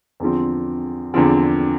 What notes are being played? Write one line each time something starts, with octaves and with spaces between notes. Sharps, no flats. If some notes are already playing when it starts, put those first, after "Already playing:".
E2 D3 F3 C4
E2 D3 F3 C4